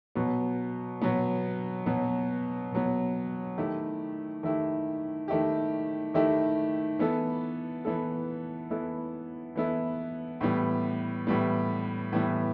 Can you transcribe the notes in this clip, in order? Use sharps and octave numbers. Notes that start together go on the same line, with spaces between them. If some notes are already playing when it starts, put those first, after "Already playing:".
B2 F#3 B3
B2 F#3 B3
B2 F#3 B3
B2 F#3 B3
D#3 A3 E4 G4
D#3 A3 E4 G4
D#3 A3 E4 G4
D#3 A3 E4 G4
E3 B3 E4 A4
E3 B3 E4 A4
E3 B3 E4 A4
E3 B3 E4 A4
A2 E3 G3 B3
A2 E3 G3 B3
A2 E3 G3 B3